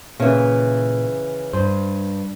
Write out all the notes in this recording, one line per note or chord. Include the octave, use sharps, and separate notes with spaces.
A#2 C#3 E3
G2 C5